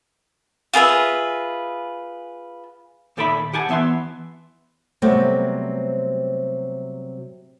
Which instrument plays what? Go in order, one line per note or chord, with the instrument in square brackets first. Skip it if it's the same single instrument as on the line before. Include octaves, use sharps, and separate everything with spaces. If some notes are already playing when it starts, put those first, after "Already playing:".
[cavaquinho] F4 G#4 B4 E5
[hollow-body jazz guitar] A#2 D#3 A4 D5 E5 B5
G4 F#5 G#5 A5
E3 B3 E5 G#5 C6
[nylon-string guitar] C3 F#3 G3 A3 B3 C4